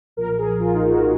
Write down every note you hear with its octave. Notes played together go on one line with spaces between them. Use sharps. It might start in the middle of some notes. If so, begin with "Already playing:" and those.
B1 A#2 F3 A#4
G#4
F4
D#4
F#4